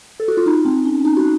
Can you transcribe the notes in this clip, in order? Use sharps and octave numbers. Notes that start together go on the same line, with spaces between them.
A4
F#4
F4
D#4
C4
C#4
D#4
F#4